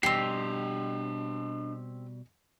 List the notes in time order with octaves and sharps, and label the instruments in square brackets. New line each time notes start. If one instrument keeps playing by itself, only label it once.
[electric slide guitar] B2 G3 [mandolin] C4 G4 [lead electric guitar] D4 D#5 [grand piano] C7